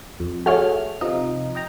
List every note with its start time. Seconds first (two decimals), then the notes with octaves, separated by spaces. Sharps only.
0.20 F2
0.46 A3 F#4 G#4 C#5 F6
1.01 C3 F3 D#4 D#5
1.55 D#5 G5 A#5